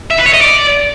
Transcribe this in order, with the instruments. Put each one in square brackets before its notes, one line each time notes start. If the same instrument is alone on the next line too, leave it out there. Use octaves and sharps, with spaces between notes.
[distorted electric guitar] E5
B4
C#5
D#5
D5